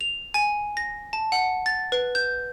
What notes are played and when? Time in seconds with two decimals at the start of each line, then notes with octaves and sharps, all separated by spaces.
0.01 F7
0.34 G#5
0.77 A#6
1.13 A5
1.32 F#5
1.66 A6
1.92 B4
2.15 G6